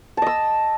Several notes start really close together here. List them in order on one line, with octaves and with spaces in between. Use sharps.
A5 D#5 E6